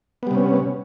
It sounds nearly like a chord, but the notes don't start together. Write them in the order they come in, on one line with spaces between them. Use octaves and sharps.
B3 G3 C3 C#4